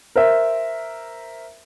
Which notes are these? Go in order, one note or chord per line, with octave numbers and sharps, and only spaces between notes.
A#4 C5 E5